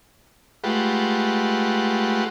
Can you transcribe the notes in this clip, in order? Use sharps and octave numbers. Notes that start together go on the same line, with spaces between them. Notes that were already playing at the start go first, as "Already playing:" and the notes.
G#3 A3 F4 G4 B4 F#5